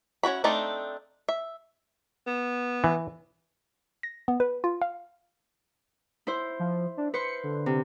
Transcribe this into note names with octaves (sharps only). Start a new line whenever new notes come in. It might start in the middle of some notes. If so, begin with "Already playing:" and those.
C#4 E4 F#4 B5
A3 C4 D4 D#4 A4
E5
B3
E3
A#6
B3
B4
F4
F5
E4 C5
F3
D4
B4 C5 C#7
D3
C3